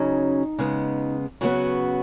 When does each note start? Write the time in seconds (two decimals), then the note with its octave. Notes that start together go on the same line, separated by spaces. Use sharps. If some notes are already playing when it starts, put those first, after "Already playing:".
Already playing: C#3 F#3 C#4 D#4
0.59 C#3 G#3 B3
1.41 C#3 F#3 B3 F#4